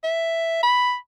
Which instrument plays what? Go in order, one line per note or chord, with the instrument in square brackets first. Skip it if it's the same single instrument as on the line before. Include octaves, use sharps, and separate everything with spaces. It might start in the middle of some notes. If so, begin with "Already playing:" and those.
[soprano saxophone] E5
B5